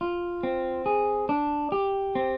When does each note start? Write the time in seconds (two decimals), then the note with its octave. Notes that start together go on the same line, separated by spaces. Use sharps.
0.01 F4
0.43 C4
0.86 G#4
1.29 D4
1.72 G4
2.15 C4